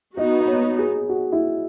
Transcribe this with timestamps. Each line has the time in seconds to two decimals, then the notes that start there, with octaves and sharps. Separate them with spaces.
0.17 B3 D#4 F#4 D#5
0.40 D#5
0.47 C#5
0.78 G#4
1.09 F#4
1.32 E4